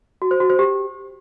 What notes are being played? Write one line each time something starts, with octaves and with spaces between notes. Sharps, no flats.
F#4
C5
F#4
C5
G4